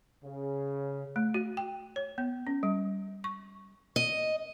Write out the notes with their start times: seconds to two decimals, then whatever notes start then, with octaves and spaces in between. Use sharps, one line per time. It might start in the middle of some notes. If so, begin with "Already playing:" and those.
0.24 C#3
1.16 A3
1.34 F#4
1.57 G5
1.96 C#5
2.18 B3
2.47 C#4
2.63 G3
3.24 C#6
3.96 D#5